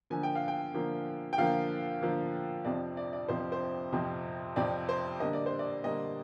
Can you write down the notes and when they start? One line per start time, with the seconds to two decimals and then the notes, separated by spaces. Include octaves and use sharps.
0.10 D3 F3 A#3 G#5
0.23 G5
0.35 F5
0.48 G5
0.74 D3 F3 A#3
1.33 G5
1.38 D3 F3 A#3 F5
2.01 D3 F3 A#3
2.65 F2 C3 F3 C4 D5
2.97 D5
3.13 D5
3.28 F2 C3 F3 C4 C5
3.52 C5
3.92 F2 C3 F3 C4
4.56 F2 C3 F3 C4 D5
4.89 C5
5.20 D3 G3 A#3 D#5
5.33 D5
5.46 C5
5.59 D5
5.84 D3 G3 A#3 D#5